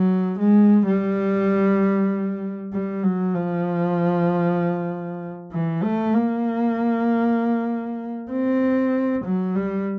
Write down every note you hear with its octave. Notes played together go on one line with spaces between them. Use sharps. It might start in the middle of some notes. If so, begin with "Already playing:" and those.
Already playing: F#3
G#3
G3
G3
F#3
F3
E3
A3
A#3
C4
F#3
G3